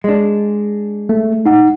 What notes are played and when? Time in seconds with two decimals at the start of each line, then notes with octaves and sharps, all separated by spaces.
0.04 G#3 D4
1.09 A3
1.46 D#4 F#5